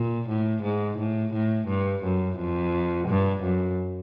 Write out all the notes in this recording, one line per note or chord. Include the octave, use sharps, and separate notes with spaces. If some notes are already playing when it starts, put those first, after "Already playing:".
Already playing: A#2
A2
G#2
A2
A2
G2
F#2
F2
G2
F#2